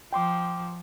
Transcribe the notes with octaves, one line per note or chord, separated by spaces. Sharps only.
F3 G5 C6 D6